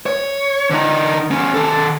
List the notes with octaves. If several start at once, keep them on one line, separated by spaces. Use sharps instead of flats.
C#5
D3 D#4
E2 C#4
D#3 A4